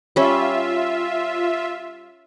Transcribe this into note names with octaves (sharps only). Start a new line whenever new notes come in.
G3 C#4 F4 E5